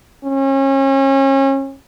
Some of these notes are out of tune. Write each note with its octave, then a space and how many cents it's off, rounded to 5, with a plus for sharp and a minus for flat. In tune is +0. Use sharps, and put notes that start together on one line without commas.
C#4 -35